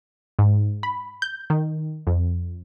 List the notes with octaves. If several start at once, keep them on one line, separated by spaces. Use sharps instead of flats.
G#2
B5
G6
D#3
F2